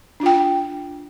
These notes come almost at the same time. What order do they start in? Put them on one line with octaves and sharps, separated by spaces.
D4 F4 G5